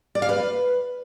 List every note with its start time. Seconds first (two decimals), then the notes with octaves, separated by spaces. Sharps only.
0.15 D5
0.22 F5
0.29 B4